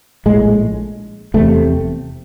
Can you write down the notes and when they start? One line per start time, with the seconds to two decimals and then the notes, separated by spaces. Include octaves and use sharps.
0.26 A#1 A2 G#3
1.34 F1 E2 C3 A3